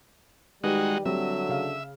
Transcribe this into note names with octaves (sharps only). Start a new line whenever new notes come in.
D#3 G3 G#3 D#4 F#4 G4 B4
D3 F#3 G3 C4 G4 E5
C#3 F5